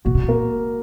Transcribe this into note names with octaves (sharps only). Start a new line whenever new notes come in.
A#2 F#4
C3
A#2
A#3 A#4